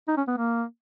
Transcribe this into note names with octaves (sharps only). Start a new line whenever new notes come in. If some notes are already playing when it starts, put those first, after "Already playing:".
D#4
C#4
B3
A#3